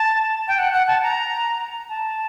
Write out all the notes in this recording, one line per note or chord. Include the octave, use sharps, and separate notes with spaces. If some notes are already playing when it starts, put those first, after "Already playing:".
Already playing: A5
G5
F#5
F#5
A5
A#5
A5